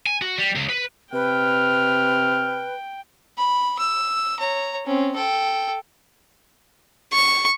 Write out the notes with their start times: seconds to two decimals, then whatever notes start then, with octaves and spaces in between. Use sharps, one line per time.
0.06 G#5
0.22 F#4
0.38 G3
0.55 C#2
0.69 B4
1.13 C3 B4 G5 F6
3.38 B5
3.79 E6
4.39 C#5 A#5
4.86 C4 C#4
5.15 A4 G5
7.13 C#6